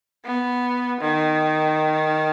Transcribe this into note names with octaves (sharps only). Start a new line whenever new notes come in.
B3
D#3